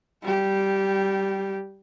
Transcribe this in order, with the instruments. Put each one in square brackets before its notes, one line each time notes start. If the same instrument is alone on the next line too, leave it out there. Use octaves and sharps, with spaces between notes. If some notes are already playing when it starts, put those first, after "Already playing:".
[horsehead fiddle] G3 G4